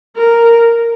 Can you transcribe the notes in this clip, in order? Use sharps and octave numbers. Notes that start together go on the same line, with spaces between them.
A#4